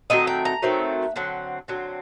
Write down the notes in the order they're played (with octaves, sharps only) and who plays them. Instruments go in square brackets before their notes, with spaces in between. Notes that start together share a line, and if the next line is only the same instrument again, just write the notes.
[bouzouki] D#3 F#3 A3 C4 D#5
G5
A#5
D#3 F#3 A3 C4
D3 F#3 C4
D3 F#3 C4